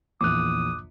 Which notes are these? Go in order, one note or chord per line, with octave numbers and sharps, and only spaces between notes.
A#1 E2 D6 D#6 F#6